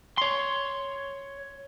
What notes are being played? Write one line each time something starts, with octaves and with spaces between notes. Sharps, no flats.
C#5 C6